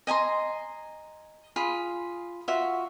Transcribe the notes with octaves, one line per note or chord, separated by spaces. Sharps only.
D#5 G#5 A#5 C6
F4 G#4 B5
F4 F#4 E5